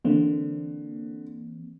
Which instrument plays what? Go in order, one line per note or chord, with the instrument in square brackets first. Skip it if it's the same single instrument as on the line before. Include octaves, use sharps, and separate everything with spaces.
[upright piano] D3 [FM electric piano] E3 A#3 C4